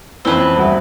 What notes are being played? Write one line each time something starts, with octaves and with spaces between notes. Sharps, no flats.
F2 E3 C4 C#4 B4
D#1 F#4 E5